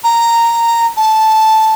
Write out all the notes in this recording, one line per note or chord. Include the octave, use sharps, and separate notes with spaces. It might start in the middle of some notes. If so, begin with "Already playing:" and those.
A#5
A5